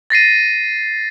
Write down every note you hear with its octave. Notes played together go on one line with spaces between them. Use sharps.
A6 A#6 C7 D#7